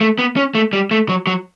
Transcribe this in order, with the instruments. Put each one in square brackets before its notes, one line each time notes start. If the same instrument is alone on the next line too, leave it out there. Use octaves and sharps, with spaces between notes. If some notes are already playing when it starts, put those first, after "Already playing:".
[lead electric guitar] A3
B3
C#4
A3
G3
A3
F#3
F#3